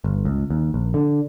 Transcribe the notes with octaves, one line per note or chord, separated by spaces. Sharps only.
G1
C#2
D#2
A#1
D3